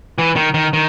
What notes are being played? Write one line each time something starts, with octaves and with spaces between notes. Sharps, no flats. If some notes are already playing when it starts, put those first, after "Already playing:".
E3
D#3
D#3
D#3